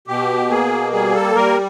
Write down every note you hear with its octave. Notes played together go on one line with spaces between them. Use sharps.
B2 G4
A#3 G#4
G3 G#4
A4
G3 A#4